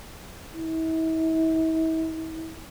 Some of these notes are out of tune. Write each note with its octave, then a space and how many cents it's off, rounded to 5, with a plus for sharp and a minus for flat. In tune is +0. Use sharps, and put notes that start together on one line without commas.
E4 -40